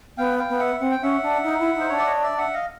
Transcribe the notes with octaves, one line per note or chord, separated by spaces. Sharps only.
B3 F5 G5
F5 G5
B3
E5 F#5
C4 F#5
G5
C#4 E5 F#5
D4
D#4
E4
D#4
C5
D4 C#5
D5
C#5 D#5
D5 E5
E5 F#5
D#5 F5